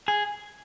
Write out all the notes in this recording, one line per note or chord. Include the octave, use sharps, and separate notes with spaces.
G#4